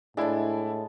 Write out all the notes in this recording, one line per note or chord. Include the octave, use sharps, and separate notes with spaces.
A2 G#3 D4 E4 A5